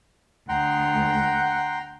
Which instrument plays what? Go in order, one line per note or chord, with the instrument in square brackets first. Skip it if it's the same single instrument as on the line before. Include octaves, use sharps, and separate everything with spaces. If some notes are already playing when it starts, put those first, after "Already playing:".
[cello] D2 [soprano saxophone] F#5 [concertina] G5 A#5 C6